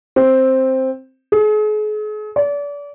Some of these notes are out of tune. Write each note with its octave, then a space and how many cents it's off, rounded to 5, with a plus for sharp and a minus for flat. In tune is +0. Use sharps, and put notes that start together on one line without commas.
C4 +5
G#4 +40
D5 -35